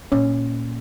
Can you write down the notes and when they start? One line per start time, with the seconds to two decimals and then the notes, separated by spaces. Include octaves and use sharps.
0.12 A#2 C#4